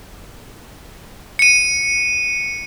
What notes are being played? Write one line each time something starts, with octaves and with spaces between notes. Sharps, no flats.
C#7 D#7